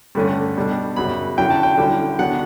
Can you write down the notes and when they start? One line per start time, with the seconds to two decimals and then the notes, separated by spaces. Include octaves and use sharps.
0.15 G2 D3 A3 C#4
0.56 B2 G3 D4
0.96 F#2 C#3 F#3 B5
1.37 D3 F#3 C#4 E4 G5
1.50 A5
1.63 G5
1.78 D3 G3 C#4 E4
2.19 D3 F#3 B3 D4 F#5